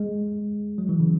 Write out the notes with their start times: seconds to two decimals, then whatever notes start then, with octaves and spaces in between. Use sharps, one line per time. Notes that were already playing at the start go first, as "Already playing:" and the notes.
Already playing: G#3
0.78 F#3
0.89 E3
1.00 C#3